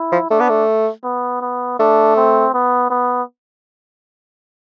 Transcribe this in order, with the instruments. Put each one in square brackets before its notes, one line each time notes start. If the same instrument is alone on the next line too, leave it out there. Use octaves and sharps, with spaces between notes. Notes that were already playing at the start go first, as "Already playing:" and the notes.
Already playing: [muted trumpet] E4
[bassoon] F3
[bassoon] A3 [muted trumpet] D4
[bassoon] B3
A3
[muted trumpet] B3
B3
[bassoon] A3 [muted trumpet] D4
[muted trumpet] C4
B3
B3